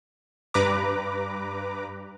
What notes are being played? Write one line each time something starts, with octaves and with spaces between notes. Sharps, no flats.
G2 B4 A#5 D6